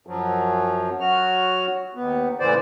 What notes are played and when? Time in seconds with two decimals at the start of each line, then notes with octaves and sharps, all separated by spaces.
0.07 F#2 F3 F#3
1.00 F#3 F#4 F6
1.94 D#2 B3
2.40 A2 C#3 E3 C5 D5